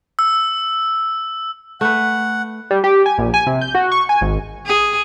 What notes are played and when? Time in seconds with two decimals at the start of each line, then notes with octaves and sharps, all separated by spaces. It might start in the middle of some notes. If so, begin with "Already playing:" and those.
0.19 E6
1.81 A3 B4 F#5
2.71 G3
2.84 G4
3.06 G#5
3.18 A#1
3.34 G#5
3.47 C3
3.61 G6
3.75 F#4
3.92 C#6
4.09 G#5
4.21 G#1
4.66 G#4